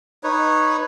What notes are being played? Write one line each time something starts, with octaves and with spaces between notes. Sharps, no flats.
D#4 B4 C#5